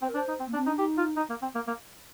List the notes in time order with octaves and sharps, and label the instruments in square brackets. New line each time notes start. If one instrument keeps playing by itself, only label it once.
[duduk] C4 [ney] C5
[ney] A#4
[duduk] D4 [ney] C5
[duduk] D#4
C4
[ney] A#3
[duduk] D4
[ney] C4
[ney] D4 [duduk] D#4
[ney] D#4 [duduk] G4
[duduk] F4
D#4
A#3
C4
A#3
A#3